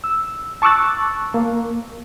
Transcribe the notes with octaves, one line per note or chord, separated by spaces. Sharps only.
E6
A5 C#6 D6 E6 F#6 A6
A#3